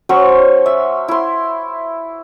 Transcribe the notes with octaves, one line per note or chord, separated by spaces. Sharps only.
F#3 C#4 C5 C#6
E5
E4 C6